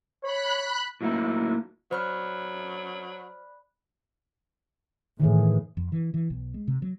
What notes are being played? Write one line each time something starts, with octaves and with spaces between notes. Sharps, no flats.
C#5 B5 F#6
A2 F#3 A#3 D#4 E4
F#3 C5 D5 B5 F6 F#6
A2 D#3 E3 G#4
F2
E3
E3
B1
G#3
C3
F#3